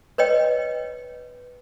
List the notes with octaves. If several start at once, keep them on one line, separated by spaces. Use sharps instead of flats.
B4 C#5 D#5 G5